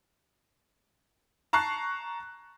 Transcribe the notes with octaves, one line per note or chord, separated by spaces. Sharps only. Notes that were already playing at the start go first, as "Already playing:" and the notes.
A5 A#5 C#6 F#6 C7